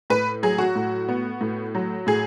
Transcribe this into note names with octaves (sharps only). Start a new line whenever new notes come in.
A2 B4
F#3 G#4
F#4
A2
B3
A2
F#3
A2 G#4